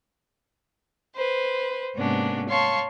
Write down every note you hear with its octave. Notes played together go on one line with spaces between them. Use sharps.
B4 C5
G#2 C3 A#3 B3 C#4 D4
C#5 F5 A5 C6 C#6